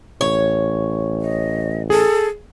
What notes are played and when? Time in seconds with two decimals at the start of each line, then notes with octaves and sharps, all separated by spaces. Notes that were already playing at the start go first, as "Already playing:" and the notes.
0.21 A1 C#5
1.21 D#5
1.90 G#4 A4